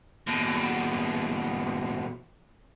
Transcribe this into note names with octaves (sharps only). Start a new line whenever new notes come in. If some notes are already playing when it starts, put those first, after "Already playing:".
D#2 B2